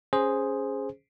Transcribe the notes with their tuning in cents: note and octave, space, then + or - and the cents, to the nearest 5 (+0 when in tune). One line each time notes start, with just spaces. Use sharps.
C#4 +0 G#4 +0 C5 +0